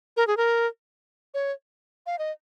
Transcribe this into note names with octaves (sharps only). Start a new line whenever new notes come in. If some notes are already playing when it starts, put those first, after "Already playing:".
A#4
G#4
A#4
C#5
F5
D#5